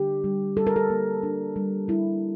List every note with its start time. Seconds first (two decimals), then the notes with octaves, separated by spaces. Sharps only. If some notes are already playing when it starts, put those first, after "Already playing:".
Already playing: D3 D4 G4
0.24 G3
0.57 G3 A4
0.67 A#4
0.76 A4
0.90 A#3
1.23 D4
1.56 G3
1.88 G3 E4